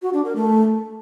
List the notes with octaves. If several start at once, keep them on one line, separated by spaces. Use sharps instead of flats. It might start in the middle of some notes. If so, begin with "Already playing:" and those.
F#4
D4
A#4
A3